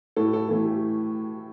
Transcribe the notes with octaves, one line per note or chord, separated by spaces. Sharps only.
A2 A4
A4
E3 A3 A4
G4